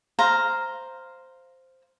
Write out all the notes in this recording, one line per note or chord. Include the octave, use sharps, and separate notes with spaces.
C5 F5 A#5